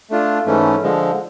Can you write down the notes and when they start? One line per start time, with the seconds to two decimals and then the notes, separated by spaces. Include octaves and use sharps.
0.10 A3 D4 F4
0.46 G#2 E3 A3 C#4
0.82 D3 F3 G#3